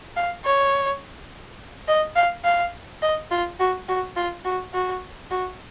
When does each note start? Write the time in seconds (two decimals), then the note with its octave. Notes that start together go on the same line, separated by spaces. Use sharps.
0.17 F5
0.45 C#5
1.88 D#5
2.16 F5
2.44 F5
3.02 D#5
3.31 F4
3.60 F#4
3.89 F#4
4.16 F4
4.45 F#4
4.74 F#4
5.31 F#4